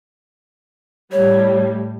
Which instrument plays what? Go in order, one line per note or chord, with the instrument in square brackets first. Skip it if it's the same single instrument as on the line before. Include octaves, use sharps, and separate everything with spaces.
[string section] A2 G3 [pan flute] C#5